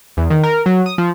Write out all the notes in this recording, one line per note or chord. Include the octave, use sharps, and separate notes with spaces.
E2
D#3
A#4
F#3
D#6
F3